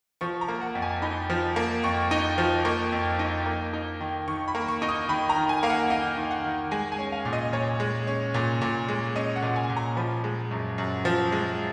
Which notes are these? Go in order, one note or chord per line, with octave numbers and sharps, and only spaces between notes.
F3 C#6
A#5
A#3
F#5
F2
G#5
D#4 B5
F3
A#3
F2 C#6
D#4
F3
A#3 C#6
F2
D#4
A#3
D#4
D#3
D#3 C#6
B5
A#3
C#6
D#4
D#6
D#3 B5
A#5
D#3
G#5
A#3 F5
F#5
D#4 F5
D#3
F#5
D#3
G#3 G#5
G#5
C#4
F5
A#2
D#5
A#2 C#5
G#3
C#4
A#2
A#2
G#3
C#4 D#5
F#5
A#2
G#5
A#2
A#5
F3 B5
G#3
F#2
F#2
F3
G#3